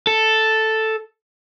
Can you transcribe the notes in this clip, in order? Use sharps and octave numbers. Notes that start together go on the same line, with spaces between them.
A4